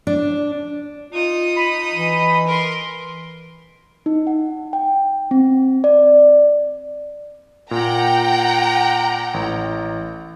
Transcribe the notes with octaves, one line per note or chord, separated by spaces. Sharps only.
D4
D#4 F4 D#6
B5
E3
A#4 C6
D#4
F#5
G5
C4
D5
A#2 F#5 G5 A#5
A1